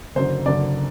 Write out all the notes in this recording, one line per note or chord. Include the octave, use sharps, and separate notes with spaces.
F#1 F#2 D3 C5
F#1 F#2 D3 D5